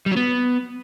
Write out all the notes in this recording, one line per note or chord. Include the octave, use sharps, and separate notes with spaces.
G3
F#3
B3